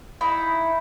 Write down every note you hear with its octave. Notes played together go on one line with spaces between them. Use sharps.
D#4 E4